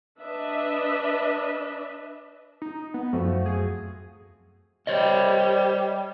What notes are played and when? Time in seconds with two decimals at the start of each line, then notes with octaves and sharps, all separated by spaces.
0.20 D4 B4 D#5 E5
2.62 D#4
2.94 B3
3.13 F#2 F3 A3 C4 F#4
3.46 G#4
4.87 G3 C5 C#5 D#5